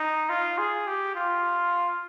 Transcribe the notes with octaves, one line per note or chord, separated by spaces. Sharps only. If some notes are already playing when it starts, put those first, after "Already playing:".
Already playing: D#4
F4
G#4
G4
F4